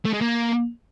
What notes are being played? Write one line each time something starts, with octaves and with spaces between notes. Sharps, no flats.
A3
G#3
A#3